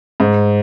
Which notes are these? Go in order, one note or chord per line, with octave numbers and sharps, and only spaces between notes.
G#2